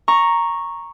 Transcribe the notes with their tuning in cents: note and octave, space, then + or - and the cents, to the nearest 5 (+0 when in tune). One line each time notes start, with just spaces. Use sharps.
A#5 +0 C#6 -5